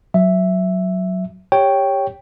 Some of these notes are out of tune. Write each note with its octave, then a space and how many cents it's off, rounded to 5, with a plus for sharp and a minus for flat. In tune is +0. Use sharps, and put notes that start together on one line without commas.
F#3 +0 E5 +0
G4 +20 C#5 +0 G5 +0